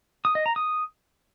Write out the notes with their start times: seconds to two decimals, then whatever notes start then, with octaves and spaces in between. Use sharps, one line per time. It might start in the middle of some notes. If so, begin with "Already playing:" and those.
0.25 D#6
0.35 D#5
0.46 A#5
0.56 D#6